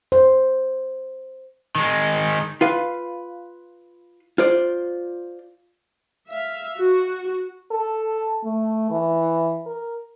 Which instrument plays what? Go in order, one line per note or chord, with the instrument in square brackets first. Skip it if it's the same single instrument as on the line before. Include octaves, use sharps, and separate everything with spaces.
[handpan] C5
[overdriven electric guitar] D#3 G#3
[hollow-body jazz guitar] F4 B4 F5
F4 C5 D5
[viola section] E5 F5
F#4
[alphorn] A4
A3
E3
A#4